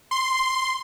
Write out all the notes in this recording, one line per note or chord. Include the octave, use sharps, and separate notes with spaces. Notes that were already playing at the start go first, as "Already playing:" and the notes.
C6